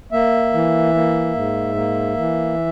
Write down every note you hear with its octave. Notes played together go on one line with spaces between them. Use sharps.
A#3 E5
E3
A#3
G#2
A#3
E3